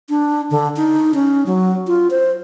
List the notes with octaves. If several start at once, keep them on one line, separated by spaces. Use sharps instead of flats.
D4
D3
D#4
C#4
F#3
F4
C5